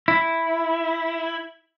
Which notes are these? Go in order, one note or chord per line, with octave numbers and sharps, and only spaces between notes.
E4